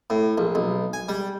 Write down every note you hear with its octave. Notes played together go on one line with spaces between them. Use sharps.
A2
A#1
B1
G#5
G3